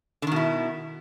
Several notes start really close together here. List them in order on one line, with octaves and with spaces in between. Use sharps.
D3 D#3 B2 E4